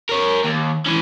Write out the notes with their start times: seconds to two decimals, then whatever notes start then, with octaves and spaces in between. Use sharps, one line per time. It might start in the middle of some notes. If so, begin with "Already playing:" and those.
0.09 A#4 C#5
0.44 D#2
0.86 E3 C#4